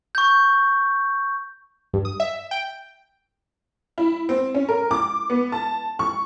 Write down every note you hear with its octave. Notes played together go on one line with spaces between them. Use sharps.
C#6 G6
G2
D#6
E5
G5
E4
C4
C#4
A#4
D6
B3
A5
C#6